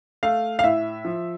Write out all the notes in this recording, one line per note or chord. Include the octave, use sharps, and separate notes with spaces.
A3 F5
F5
A2 E5
F3